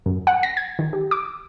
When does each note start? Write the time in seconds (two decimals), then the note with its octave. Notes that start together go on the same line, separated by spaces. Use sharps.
0.06 F#2
0.27 F#5
0.43 A#6
0.57 G#6
0.79 D#3
0.93 G4
1.11 D6